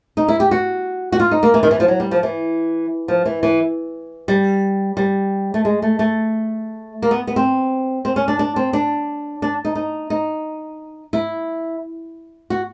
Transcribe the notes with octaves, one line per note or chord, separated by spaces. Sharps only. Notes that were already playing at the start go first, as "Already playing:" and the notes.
D#4
E4
G4
F#4
F#4
F4
D#4
A#3
E3
D#3
E3
F3
F#3
G3
F3
E3
F3
E3
E3
G3
G3
A3
G#3
A3
A3
A#3
B3
B3
C4
C4
C#4
D4
D4
C4
D4
D4
D#4
D#4
D#4
E4
F#4